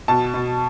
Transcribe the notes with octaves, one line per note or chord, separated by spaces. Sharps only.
B2 A5
B2